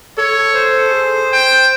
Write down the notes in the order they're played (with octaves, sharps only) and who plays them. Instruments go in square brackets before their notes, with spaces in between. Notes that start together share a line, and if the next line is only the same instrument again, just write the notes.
[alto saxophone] A4 [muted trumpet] C#5
[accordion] C5
[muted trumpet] G#4
G5